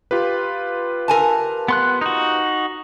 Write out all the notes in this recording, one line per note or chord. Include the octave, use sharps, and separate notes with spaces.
F4 G4 B4
A#4 G#5 A5
B3 C6 F#6
D#4 F#4